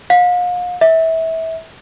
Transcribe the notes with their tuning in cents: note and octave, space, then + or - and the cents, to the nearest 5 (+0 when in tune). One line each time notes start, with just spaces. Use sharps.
F5 +40
E5 -25